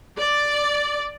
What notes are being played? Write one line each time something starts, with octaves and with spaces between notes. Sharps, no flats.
D5